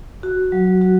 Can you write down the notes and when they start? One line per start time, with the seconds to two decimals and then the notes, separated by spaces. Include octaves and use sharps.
0.23 F#4
0.52 F#3
0.81 F#4